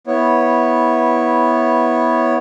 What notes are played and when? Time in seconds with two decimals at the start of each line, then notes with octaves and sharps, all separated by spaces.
0.07 B3 E4 C#5